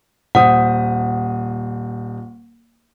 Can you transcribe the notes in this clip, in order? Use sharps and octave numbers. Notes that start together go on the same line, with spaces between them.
D#1 C5 F#5 D#6